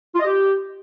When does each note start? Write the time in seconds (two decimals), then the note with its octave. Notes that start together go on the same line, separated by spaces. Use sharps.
0.14 F4
0.20 D#5
0.25 G4